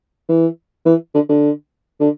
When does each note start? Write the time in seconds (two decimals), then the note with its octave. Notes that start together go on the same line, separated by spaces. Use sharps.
0.29 E3
0.85 E3
1.14 D3
1.29 D3
2.00 D3